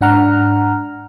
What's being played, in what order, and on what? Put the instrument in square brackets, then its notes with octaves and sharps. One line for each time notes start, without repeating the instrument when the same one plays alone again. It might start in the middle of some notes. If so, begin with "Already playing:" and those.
[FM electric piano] G#2 D4 F#5 A#5 F6